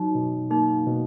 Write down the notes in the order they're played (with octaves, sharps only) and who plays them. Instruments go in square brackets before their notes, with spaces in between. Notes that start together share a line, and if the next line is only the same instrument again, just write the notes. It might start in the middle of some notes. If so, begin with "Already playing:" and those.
Already playing: [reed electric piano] F#3 [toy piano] D#4
[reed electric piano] B2
[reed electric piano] A#3 [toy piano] D#4
[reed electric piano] B2